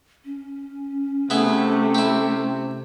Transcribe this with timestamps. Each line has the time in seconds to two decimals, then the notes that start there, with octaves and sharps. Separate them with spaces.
0.25 C#4
1.30 C3 A3 B3 E4 G#4
1.95 E4 G4